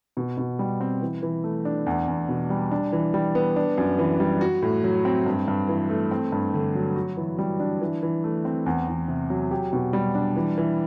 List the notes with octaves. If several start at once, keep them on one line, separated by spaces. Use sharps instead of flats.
B2
B2
G3
C4
E3
E3
A3
D4
E2
E2
B2
G3
D4
E3
G3
B3
D4
F#2
E3
G3
F#4
A2
F#3
C4
G2
G2
E3
A3
C4
G2
D3
F#3
F#4
E3
G3
D4
E3
E3
A3
C4
E2
E2
C3
F#3
G4
B2
G3
D4
E3
E3